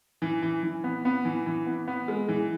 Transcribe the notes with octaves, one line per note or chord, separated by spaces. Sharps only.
E3
E3
E3
B3
B3
E3
E3
B3
B3
G#3
E3